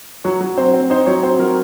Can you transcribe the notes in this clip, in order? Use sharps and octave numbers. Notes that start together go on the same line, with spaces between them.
F#3 C#5
F#3
C4 C5
C4
D#4 C5
F#3 C#5
C4 C5
F#3 A#4